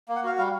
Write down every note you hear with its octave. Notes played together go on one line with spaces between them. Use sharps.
A#3
F#5
F#4 F5
G3 F5